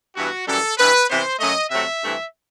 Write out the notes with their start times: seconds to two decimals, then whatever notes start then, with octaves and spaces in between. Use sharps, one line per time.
0.15 G2 E3 B3 F#4
0.46 F#2 E3 G3 A4
0.77 G2 E3 G3 B4
1.08 C3 E3 B3 C5
1.39 F#2 F#3 A3 D#5
1.70 C3 F#3 A3 C4 E5
2.02 G2 E3 A3 C4